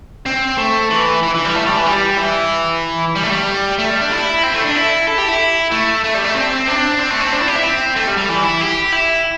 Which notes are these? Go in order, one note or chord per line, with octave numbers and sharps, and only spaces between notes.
C4
A3
E3
E3
E3
G3
A3
G3
E3
G3
E3
G3
A3
G3
A3
G3
D4
E4
C4
A3
D4
E4
A4
G4
E4
A3
A3
G3
A3
C4
D4
C4
A3
C4
D4
E4
G4
E4
C4
A3
G3
G3
E3
E4
G4
E4